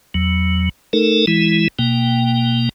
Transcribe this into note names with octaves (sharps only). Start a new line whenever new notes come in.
E2 F#3
A3 D#4 A4 A#4
E3 G#3 E4
B2 A#3 G5